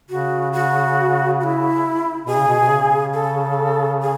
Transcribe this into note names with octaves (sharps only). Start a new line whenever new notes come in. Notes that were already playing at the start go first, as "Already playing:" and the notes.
C#3 F#4
F#4
F#4
E4
B2 G#4
C#3
B2
B2
C#3
A4
G#4